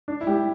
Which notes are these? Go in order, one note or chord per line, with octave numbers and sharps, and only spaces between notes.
D4
E4
G3 G4